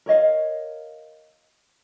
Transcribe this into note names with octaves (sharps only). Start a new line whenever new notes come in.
A#4 C#5 D#5 F5